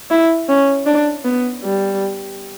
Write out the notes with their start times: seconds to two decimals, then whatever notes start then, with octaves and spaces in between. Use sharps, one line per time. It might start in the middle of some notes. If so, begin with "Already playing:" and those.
0.11 E4
0.49 C#4
0.86 D4
1.25 B3
1.64 G3